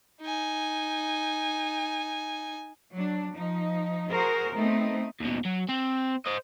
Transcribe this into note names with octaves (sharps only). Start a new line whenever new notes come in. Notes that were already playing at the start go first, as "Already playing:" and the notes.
D#4 G#5
F#3 D4
F3 D#4
F#4 G#4 A#4 C5
A3 B3 C4 D#4
D#2 B2
F#3
C4
C5 D#5